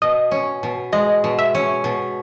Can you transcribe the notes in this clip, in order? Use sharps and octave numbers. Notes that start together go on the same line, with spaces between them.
B2 D#5
C#4
B2
G#3 D#5
B2
E5
C#4
B2